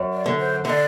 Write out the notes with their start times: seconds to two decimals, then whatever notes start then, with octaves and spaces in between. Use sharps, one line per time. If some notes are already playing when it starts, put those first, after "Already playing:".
Already playing: F#2
0.13 D5
0.26 D3
0.39 C5
0.65 D3 E5
0.69 D5